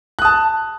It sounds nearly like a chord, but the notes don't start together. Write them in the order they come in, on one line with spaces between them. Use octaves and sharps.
F#6 D#6 A5